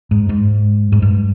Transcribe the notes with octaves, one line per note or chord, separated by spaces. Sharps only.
G#2
G#2
G#2
G2